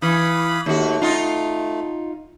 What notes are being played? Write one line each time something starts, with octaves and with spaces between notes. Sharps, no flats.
E3 F5 B5 D#6
D#2 A3 F#4
D#4 F4